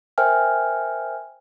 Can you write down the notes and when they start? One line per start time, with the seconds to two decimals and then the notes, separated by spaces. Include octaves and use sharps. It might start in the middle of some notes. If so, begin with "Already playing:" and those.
0.18 A#4 C5 E5 G5 G#5 F6